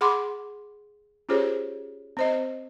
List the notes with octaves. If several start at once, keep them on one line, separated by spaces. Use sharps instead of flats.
G#4 F#5 B5 C6 D6
C#4 F4 G4 G#4 C5 C#5
C4 C5 D#5